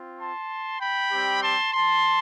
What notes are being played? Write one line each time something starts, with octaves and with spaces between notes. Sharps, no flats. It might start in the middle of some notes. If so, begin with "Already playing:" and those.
Already playing: C4 F4
A5 C6
G5 B5
G3 C4 G4
A5 C6
A5 C6